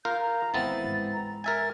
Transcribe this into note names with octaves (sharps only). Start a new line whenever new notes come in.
F4 A#4 F5 G6
A#5
G#1 E3 B3 C4 A6
G#2
A#5
A#4 E5 G#5 A6